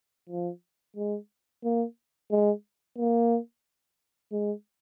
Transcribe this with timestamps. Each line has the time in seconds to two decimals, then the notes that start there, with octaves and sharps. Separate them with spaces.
0.29 F3
0.97 G#3
1.64 A#3
2.31 G#3
2.98 A#3
4.32 G#3